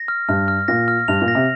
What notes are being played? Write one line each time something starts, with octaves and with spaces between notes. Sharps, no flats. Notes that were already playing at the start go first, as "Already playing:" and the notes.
Already playing: A#6
F6
G2 F6
F6
A#2 A#6
F6
G2 F7
A#2
A#6
C3